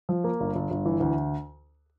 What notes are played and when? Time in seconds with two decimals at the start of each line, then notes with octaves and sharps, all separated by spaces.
0.09 F3
0.24 A#3
0.40 G1
0.55 G1
0.71 G1
0.85 E3
1.00 D2